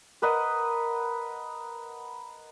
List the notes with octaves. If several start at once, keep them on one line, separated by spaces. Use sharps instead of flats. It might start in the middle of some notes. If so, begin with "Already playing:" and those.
A#4 B4 D#5 F#5